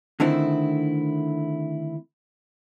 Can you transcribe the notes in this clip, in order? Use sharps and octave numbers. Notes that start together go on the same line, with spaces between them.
D3 D#3 A3 C4 E4